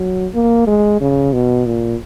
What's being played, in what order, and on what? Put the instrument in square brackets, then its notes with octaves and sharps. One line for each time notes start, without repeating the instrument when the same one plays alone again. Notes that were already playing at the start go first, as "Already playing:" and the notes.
Already playing: [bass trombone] F#3
A#3
G#3
C#3
B2
A#2